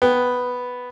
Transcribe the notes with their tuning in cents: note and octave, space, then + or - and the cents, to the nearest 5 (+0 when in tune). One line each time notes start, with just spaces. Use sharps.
B3 +0 G5 +0